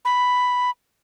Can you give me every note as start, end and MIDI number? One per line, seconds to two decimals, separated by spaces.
0.05 0.70 83